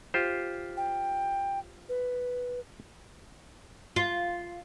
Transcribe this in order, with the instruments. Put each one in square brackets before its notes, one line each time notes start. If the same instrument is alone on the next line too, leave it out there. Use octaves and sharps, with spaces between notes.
[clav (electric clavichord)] F4 G4 C5
[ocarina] G5
B4
[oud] F4